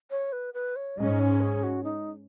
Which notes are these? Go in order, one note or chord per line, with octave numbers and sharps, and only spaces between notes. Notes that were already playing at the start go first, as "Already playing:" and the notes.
C#5
B4
B4
C#5
G#2 G#3 C#4 D#5
C#5
G#4
F#4
D#4